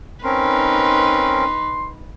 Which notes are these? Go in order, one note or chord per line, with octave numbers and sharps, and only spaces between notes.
C4 C#4 D#4 A#4 B4 C6